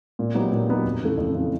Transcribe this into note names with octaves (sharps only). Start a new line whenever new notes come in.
A#2
F#3 B3 D#4 G4
A#2
F#3 B3 D#4 G4
F2
C#3 E3 A3
F2
C#3 E3 A3